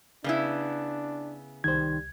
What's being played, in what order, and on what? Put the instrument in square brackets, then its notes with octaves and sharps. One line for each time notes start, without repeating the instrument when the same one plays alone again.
[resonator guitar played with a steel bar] C#3 B3 E4 [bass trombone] D4
[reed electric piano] C2 G#6 [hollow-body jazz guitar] D#3 C5 [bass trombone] G3